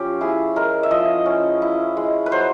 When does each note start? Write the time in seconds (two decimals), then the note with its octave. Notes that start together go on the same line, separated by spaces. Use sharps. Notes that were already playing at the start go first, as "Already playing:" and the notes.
Already playing: F3 C#4 G4
0.21 E4 G#4
0.56 G#3 A#4
0.83 E5
0.91 F3 D#5
1.26 C#4
1.62 E4
1.97 G#3
2.26 B4
2.32 F#3 C5